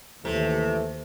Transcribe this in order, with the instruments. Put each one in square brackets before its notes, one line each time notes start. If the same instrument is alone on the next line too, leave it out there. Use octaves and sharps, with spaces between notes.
[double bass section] D#2 [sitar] C3 [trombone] E3 [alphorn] A3